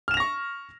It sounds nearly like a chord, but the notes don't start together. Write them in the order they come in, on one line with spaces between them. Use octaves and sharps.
F6 E7 F7 A#6 C#6